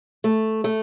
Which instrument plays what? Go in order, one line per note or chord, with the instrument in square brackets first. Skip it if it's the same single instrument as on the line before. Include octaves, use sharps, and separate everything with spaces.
[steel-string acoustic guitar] A3
A3